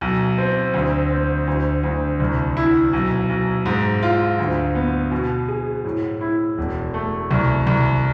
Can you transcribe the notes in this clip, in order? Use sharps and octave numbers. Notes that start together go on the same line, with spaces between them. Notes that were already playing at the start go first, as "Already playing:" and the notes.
B1
C4
D2
C4
D2
D2
C2
E4
B1
B1
G#2
F4
D2
B3
B2
G#4
A2
E4
E1
A3
C2
C2